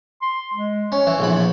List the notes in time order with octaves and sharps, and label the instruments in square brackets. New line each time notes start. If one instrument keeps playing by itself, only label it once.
[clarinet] C6
G#3
[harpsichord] C#4 [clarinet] C#5
[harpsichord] E3
A#1 E2 B5